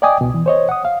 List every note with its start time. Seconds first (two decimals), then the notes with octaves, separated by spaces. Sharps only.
0.02 D5 D#5 G5 G#5 D6 D#6
0.21 C2 B2
0.34 E3
0.46 C5 C#5 D#5
0.69 F#5 D#6
0.85 F5